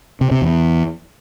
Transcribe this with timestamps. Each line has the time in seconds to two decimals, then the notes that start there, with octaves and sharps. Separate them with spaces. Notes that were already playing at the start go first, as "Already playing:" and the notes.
0.21 C3
0.31 C3
0.42 E2